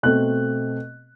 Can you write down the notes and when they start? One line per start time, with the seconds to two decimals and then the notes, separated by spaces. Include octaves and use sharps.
0.03 B2 A3 C4 F#6